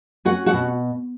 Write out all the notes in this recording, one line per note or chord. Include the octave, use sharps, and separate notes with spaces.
C#4 F#4 F#5
F#4 F#5
B2